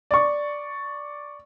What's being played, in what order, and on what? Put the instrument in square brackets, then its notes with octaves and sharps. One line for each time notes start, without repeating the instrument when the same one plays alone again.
[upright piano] D5 C#6